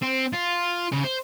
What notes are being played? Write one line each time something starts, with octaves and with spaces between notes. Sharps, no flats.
C4
F4
C#3
C5